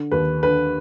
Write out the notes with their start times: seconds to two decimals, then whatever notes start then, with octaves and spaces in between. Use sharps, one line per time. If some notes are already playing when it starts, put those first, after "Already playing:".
Already playing: D3
0.11 D#2 B4
0.43 D3 B4